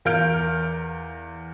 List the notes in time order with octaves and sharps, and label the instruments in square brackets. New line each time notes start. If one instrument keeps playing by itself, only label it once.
[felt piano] E2 A#4 F5 F6 G6 D7